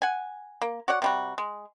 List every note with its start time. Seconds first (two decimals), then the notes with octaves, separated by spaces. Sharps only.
0.02 F#5 G#5
0.61 A#3
0.88 F#4 C#5 D5 F#5
1.02 C3 G3 F#4
1.38 G#3